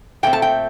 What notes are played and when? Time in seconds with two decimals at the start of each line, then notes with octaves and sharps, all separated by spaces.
0.23 A#2 A3 C4 G5
0.33 A5
0.42 G5